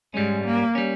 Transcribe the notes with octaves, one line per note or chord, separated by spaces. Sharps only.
G#2 G3 G#3 C#4
A#3
G3 C#4